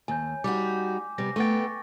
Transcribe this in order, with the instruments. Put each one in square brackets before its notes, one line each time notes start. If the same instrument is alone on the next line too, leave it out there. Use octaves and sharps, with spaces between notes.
[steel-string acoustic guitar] D#2 [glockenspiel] G#5 G6
[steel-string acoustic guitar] G3 D#4 F#4 [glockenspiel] D6
[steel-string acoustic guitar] C3 G3 B3 [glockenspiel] A#6
[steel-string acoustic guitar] A3 B3 G5 [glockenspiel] C#6 A6